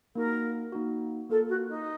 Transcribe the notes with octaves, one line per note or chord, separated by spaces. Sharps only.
A#3 D#4 F#4 A#4
A#3 D#4 F#4
A#3 F4 A4 A#4
F#4
D#4